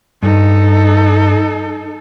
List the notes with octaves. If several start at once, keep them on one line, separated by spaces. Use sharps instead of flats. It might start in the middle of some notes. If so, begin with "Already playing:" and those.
G2 D#4 A4